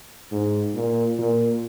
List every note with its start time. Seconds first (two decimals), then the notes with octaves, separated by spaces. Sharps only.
0.31 G#2
0.75 A#2
1.19 A#2